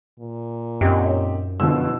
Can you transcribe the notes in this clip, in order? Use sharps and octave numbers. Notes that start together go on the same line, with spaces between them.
A#2
F#2 C4 D#4 G4
F#1 B2 D3 F3 E6